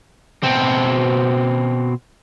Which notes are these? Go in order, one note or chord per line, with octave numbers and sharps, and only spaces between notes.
B2 C4